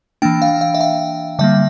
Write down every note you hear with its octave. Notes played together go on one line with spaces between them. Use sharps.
E3 A#3 D4 G5
F5
F5
E5
F5
D3 G3 A#3 E5